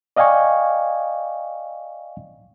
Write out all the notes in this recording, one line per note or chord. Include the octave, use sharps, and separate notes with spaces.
D5 D#5 F5 G5 G#5 C#6